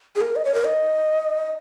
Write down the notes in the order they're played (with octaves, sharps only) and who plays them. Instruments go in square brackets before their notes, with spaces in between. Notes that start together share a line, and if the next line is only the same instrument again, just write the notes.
[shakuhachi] G#4
A#4
D#5
C#5
A#4
D#5